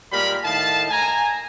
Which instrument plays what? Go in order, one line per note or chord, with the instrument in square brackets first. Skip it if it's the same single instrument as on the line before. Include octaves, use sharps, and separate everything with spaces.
[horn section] A#2 G3 G#3 A#4 F5 B5
A2 D#3 F5 A5
G#5 A#5